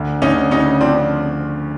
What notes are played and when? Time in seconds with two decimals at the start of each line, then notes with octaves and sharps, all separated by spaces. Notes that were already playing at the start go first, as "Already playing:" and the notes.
Already playing: D2
0.22 D2 C#4 D#4
0.51 C#3 C#4 D#4
0.81 F3 C4 D4